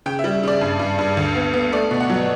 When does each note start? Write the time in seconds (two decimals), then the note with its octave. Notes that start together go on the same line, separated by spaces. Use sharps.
0.06 C#3 G5
0.19 E5
0.24 G3
0.43 C#3 D5
0.61 G2
0.79 G2
0.99 G2
1.17 D2
1.35 B3
1.53 B3
1.72 A3 D5
1.91 B2
2.00 F#5
2.10 F#3